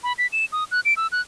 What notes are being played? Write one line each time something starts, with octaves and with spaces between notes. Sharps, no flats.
B5
B6
E7
D#6
F#6
D7
E6
F#6